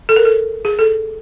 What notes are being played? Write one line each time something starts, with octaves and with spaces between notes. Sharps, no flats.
A4
A#4
A4
G#4
A4